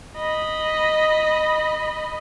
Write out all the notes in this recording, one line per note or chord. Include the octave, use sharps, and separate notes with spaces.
D#5 B5